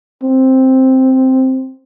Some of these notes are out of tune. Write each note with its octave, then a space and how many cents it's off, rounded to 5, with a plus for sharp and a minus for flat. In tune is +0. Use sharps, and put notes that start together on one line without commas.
C4 +0